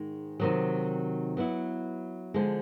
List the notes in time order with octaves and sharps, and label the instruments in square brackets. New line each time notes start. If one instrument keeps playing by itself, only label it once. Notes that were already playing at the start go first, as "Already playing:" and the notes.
Already playing: [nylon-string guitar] G#2 D#3 G#3
C3 D#3 F#3
F#3 B3 E4
D3 F3 G#3